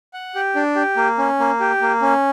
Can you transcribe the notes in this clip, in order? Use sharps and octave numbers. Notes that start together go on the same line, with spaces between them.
F#5
G4
D4
G4
A#3
C#4
A#3
G4
A#3
C#4